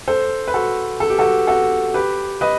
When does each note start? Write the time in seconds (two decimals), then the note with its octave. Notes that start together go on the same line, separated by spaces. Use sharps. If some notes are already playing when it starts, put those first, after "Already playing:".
0.08 A4 C5
0.48 B4
0.54 F#4 A4
1.00 A4
1.10 G4
1.19 F#4 A4
1.47 F#4 A4
1.94 G4 B4
2.41 B4 D#5